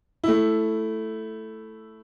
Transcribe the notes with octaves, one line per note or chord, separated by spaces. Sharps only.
A3 E4